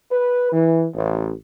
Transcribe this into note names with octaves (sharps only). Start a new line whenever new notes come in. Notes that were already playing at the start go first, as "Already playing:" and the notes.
B4
E3
A1